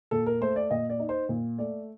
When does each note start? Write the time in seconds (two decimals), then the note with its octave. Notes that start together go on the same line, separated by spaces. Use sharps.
0.11 A#2 A4
0.26 A#4
0.41 A3 C5
0.56 D5
0.71 A#2 D#5
0.90 D5
1.00 D#4
1.09 C5
1.29 A#2
1.58 A3 D5